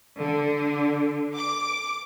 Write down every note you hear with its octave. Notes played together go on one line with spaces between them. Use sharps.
D3
D6